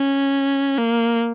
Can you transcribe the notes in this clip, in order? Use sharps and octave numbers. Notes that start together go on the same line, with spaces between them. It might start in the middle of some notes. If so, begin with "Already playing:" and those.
Already playing: C#4
A#3